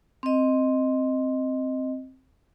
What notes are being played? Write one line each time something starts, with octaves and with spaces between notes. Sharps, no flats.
C4 D#5